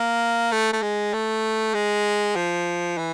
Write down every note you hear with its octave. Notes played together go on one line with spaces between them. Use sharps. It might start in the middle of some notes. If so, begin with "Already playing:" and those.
Already playing: A#3
A3
A3
G#3
A3
G#3
F3
E3